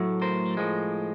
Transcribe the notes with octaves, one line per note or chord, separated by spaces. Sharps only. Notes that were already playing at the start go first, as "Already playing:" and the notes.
Already playing: A2 F#3 A3
A#4 C5
A2 F3 G#3